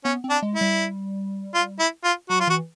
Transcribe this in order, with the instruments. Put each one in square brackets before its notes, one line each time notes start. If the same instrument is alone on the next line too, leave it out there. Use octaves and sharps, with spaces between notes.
[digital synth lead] B3 [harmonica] C#4
[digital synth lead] C4
[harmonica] D4
[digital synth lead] G#3
[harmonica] E4
[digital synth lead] G3
[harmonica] F4
E4
F4
[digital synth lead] F#3 [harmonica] F#4
[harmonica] F4
[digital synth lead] E3 [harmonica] F#4